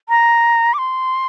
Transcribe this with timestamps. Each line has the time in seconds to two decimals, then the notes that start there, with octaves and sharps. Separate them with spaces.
0.09 A#5
0.74 D6
0.78 C6